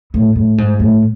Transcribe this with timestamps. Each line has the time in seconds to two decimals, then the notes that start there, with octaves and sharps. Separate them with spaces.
0.14 A2
0.36 A2
0.58 G#2
0.80 A2